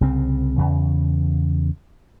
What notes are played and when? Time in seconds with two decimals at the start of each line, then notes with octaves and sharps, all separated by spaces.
0.01 C2 C#3 C4
0.58 E2 C#3